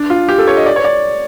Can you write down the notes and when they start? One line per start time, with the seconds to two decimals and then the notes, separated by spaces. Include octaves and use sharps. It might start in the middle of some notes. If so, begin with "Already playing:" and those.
Already playing: D4
0.10 F4
0.29 G4
0.38 A4
0.47 C#5
0.57 D#5
0.66 D5
0.76 C#5
0.84 D5